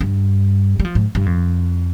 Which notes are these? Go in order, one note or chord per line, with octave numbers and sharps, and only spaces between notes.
G2
G3
F3
G#2
G2
F2